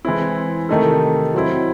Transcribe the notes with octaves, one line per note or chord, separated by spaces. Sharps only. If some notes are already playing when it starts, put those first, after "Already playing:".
E3 G#3 C4 E4
C3 D#3 A3 D#4 A4
F#3 C4 E4